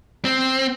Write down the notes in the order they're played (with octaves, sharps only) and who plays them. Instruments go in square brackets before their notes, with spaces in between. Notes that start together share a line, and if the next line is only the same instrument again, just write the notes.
[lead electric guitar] C4